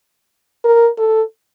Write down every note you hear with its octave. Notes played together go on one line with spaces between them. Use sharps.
A#4
A4